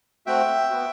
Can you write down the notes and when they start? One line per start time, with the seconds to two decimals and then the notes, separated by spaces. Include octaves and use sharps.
0.26 A3 C4 F#4 E5 G5
0.70 B3 F#4